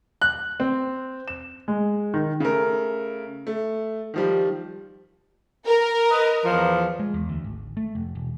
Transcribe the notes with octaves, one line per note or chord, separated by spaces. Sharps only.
F#6
C4
E7
G#3
D#3
C#3 A3 A#4
A3
D#3 F3 G3
A#4
B4 D#5
E2 F3
G#3
E2
D2
G#1
A3
F1
E1